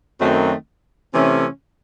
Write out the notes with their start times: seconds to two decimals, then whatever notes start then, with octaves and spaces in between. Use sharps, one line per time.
0.20 F#2 D#3 F#3 A3 C4
1.14 C3 E3 A3 C#4